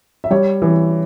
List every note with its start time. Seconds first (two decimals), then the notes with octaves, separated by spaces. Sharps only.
0.24 E5
0.30 G3 C#5
0.62 E3